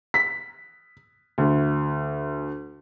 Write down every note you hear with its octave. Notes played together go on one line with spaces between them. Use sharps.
B6
D2